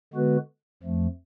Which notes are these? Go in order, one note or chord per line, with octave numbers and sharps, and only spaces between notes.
D3 G#3 B3 F#4 B4
F2 F3 A3